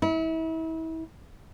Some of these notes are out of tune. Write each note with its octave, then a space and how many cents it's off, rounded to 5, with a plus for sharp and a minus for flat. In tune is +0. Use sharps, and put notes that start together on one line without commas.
E4 -35